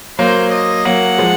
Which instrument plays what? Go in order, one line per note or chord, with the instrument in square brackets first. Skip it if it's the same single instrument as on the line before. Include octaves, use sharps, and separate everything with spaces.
[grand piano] F#3 A#3 [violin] C5
[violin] D#5
[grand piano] F#3 A#3 [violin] F#5
[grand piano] F3 G#3